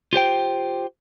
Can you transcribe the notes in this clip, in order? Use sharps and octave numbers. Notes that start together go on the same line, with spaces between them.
F4 G4 C5 G5